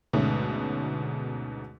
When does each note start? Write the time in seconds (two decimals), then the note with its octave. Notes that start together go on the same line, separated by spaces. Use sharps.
0.13 D2 G#2 B2 A3 C#4